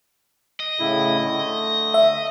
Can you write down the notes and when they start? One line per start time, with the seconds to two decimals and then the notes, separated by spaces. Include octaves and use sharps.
0.60 D#5
0.79 A2 C#3 E4
1.24 D3 A3
1.94 E5